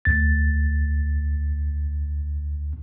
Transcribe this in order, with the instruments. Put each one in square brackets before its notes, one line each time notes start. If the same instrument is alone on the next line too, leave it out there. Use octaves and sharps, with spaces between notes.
[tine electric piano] D2 A6